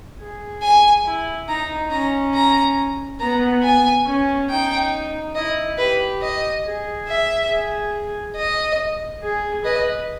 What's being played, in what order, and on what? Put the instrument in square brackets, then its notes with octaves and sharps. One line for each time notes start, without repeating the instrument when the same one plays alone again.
[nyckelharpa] G#4
[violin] G#5
[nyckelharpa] E4
[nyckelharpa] D#4 [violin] A#5
[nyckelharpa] C#4 [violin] A#5
[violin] A#5
[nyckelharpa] B3 [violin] A#5
[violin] G#5
[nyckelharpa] C#4
[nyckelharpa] D#4 [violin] G5
[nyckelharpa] E4 [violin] D#5
[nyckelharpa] G4 [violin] B4
[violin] D#5
[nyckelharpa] G#4
[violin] E5
[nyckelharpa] G#4
[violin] D#5
[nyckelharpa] G#4
[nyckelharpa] B4 [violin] D#5